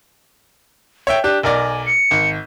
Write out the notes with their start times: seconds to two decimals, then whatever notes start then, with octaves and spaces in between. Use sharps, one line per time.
1.07 C#5 E5 G5
1.24 D4 G4 F#6
1.43 B1 A#4 D5 G#5
1.86 C#7
2.11 G#1